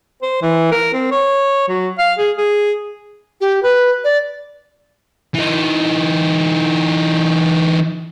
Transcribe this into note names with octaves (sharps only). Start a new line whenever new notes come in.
C5
E3
A#4
C4
C#5
F#3
F5
G#4
G#4
G4
B4
D5
E3 D#4